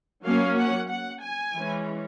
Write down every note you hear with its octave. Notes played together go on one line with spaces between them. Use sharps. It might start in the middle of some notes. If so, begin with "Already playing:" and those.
F#3 A#3 C#4 F5
F#5
F#5
G#5
E3 G#3 C#4